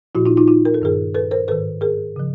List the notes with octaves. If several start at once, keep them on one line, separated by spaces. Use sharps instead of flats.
A#2 F3 E4 F#4
D#4 F4
D#4 F4
D#4 F4
A#4
A4
G2 D#3 G#4 A#4
A4 B4
A#4 C5
G#2 D#3 A4 B4
G#4 A#4
C#3 F3